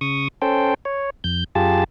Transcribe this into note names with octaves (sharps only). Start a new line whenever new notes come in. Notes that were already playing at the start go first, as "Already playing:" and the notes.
C#3 C#6 D#6
C#4 A4 C5 G5
C#5
F2 G6
F#2 F4 G4 G#4 A5